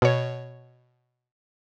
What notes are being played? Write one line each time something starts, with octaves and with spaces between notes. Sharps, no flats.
B2 C#5